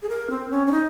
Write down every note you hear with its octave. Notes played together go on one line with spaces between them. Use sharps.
G#4
A#4
C4
C#4
C#4
D#4